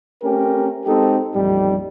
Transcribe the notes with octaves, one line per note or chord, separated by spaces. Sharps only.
A3 C4 C#4 G4 A#4
G#3 C4 D#4 G4 A4
A1 F2 A#2 G3 D#4 G4